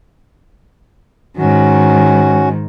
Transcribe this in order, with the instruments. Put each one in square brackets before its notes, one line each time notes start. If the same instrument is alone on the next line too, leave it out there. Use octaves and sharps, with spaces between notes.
[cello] G#2 D#3 [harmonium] C#4 F#4